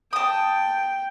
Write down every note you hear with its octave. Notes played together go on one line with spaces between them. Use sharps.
G5 A5 D#6